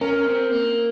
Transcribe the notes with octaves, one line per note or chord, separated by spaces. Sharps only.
C#4 A#4
C4
A#3